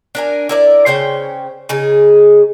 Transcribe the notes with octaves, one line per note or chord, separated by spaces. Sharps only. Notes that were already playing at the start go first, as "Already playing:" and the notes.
D4 A#4 G#5
E4 A#4 D5
C#3 C5 C#5 G5
C#3 D#4 G#4